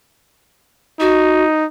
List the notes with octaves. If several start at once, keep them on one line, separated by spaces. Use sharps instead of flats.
D#4 F#4